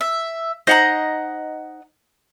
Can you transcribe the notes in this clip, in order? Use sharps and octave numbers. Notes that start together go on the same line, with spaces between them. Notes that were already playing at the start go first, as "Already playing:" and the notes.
E5
D#4 C5 D#5 F#5 A#5